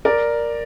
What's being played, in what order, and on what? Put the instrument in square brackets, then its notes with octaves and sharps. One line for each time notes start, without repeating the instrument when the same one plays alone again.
[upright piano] A#4 D5